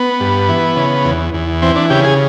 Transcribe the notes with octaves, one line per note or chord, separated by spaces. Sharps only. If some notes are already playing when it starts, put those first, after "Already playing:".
Already playing: B3
G2
E3
C#3
E2
E2
E3 C4
D4
C#3 G4
G#4